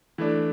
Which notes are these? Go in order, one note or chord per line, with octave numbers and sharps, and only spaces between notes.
E3 A3 D4